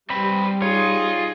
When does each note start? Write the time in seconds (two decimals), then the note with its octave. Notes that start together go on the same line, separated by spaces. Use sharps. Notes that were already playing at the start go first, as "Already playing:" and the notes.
0.10 G3 C4 G4 B4 B5
0.62 D#4 F4 G#4 C#5